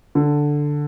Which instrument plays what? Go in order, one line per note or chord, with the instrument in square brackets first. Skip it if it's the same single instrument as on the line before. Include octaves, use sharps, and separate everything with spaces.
[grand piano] D3